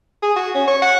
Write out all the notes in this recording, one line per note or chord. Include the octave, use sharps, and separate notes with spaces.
G#4
F#4
C#4
C#5
F#5